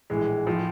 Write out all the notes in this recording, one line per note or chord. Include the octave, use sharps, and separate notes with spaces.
A#1 A2 E3 G#3
A2 F3